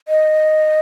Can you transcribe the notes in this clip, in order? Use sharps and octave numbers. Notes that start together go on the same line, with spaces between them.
D#5